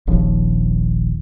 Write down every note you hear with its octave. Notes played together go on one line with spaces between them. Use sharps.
D#1 A#1 D#2 F3